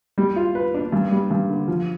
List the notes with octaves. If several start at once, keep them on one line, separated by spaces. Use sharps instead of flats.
G3
F4
B4
D4
G2
G3
G2
D3
F3